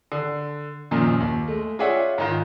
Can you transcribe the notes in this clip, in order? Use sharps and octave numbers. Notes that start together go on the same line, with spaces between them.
D3
F#2 A#2 D#3 F3
D#2
G#3 A3
F4 G#4 C#5 D5 E5 F#5
G#2 D#3 F4